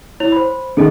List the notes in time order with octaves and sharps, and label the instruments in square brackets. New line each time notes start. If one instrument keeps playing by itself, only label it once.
[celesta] E4 C#5 F7
C5 B5
[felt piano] D#3 [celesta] G#4 A4 D#5